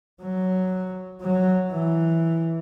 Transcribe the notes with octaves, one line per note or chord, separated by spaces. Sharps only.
F#3
F#3
E3